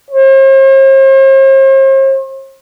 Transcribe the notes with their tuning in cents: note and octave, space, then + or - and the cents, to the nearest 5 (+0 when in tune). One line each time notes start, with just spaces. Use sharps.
C5 +45